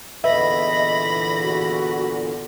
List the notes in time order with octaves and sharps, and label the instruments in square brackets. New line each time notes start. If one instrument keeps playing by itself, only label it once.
[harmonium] E2 A#2 D3 [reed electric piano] B4 E5 [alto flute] D#5 [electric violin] B5 A#6
[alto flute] F#4